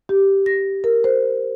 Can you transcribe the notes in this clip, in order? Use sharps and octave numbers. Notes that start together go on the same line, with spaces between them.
G4
A#6
A#4
C5